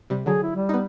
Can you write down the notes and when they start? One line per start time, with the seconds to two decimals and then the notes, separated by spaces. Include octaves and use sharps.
0.10 C3 G3
0.26 D3 F#3 G#4
0.43 E4
0.56 G3
0.69 B3 D#4